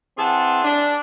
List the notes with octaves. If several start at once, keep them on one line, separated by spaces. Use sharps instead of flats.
E3 C4 G#4 F#5 A5 C6
D4